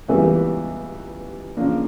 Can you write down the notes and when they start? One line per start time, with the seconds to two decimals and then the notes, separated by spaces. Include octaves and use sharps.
0.08 C#2 C#3 E3 G3 B3
1.57 C#3 F3 A#3 D4